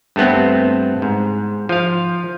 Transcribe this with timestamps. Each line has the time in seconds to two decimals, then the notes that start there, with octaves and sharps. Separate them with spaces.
0.16 G2 A3 B3 C4
1.02 G#2
1.69 F3 F5